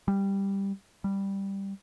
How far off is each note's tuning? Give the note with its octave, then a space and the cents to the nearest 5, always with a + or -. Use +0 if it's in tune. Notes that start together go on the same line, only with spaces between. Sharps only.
G3 +5
G3 +0